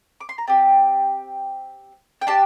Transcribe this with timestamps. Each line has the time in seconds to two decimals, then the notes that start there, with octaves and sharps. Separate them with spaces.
0.20 D6
0.29 C6
0.38 A#5
0.47 C4 G4 A5
2.22 G5
2.27 D4 G4 A5